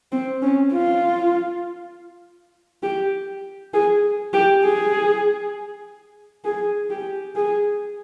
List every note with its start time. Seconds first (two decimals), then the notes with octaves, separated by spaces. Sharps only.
0.12 C4
0.42 C#4
0.73 F4
2.83 G4
3.74 G#4
4.34 G4
4.64 G#4
6.45 G#4
6.90 G4
7.35 G#4